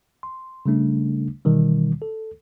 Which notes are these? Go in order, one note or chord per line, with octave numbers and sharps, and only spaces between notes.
C6
C#3 G3 A3 D4
B2 D#3 E3 G3
A4